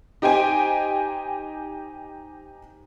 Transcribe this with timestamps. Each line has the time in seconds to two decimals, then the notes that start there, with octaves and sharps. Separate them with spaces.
0.22 D#4 G4 C5 G5 G#5